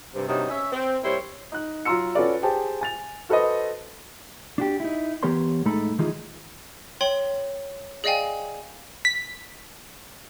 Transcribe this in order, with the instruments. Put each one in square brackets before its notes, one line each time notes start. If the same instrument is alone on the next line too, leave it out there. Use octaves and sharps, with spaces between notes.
[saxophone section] G2 C3
G2 C3 F#3 D#4
C#4 E5
C4
A#2 G3 E4 C5 C#5
[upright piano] D#4 F#6
F#3 F4 A#5 C6 E6 C#7
C#4 F4 F#4 A4 B4 D5
G4 G#4 C5 G5 A5
G#5 A6 F7
F#4 A4 B4 C5 D#5
[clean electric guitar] D4 F#4 G4
D#4 E4
E3 B3 G4 A#4 C#5 C6
A2 G#3 D#4 A4 B5
D#3 E3 G#3 D#4 F4 G#4
[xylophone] C#5 G5 C6 F#7
G#4 D5 D#5 F5 G5 G#5
[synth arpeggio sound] B6